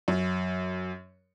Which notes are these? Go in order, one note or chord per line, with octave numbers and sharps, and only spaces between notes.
F#2